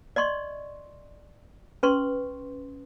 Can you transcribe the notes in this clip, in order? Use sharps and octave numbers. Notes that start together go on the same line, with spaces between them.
D5 D#5 C6 C#6
C#4 B4 C6 C#6